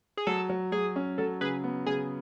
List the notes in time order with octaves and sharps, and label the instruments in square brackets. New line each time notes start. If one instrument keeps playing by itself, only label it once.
[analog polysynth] G#4
[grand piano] F#3 [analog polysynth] A4
[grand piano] F#3
[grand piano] F#3 [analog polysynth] G#4
[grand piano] C#4
[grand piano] F#3 [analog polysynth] A4
[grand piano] C#3 [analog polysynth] G#4 B4
[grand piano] B3
[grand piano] C#3 [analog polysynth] G#4